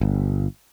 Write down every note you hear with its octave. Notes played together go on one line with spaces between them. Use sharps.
G1